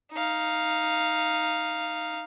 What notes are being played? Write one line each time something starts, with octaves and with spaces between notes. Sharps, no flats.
D#4 F5